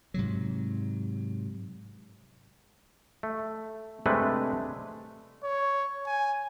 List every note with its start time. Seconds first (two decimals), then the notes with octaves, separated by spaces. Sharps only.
0.14 G#2 C3 F#3
3.23 A3
4.06 C3 G#3 A3 D4 B4
5.44 C#5
6.06 G#5